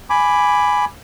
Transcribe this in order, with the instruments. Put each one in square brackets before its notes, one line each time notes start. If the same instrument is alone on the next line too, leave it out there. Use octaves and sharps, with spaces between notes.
[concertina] G#5 B5 D6